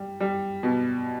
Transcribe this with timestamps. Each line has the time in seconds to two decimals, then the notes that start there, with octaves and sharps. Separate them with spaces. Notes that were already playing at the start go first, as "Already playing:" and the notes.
Already playing: G3
0.20 G3
0.63 B2